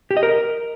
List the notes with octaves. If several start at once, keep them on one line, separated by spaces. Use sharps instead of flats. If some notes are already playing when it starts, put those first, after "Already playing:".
G4
D#5
A#4